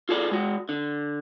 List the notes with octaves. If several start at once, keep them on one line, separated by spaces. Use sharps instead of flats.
F4 G#4 A4 D5
G#3 F#4
D3